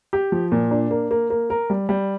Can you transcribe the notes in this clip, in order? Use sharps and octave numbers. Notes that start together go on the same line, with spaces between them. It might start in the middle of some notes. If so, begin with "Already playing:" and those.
G4
F3
A#2
D4
A#3
A#3
A#3
A#4
G3
G3